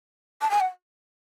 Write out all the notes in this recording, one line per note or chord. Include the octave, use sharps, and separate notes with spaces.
A5
G#5
F#5